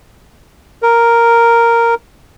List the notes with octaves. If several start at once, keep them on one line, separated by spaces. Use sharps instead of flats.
A#4